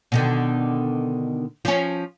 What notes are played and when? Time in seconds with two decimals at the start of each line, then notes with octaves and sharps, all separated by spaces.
0.12 B2 D3 D#3
1.65 F3 C#4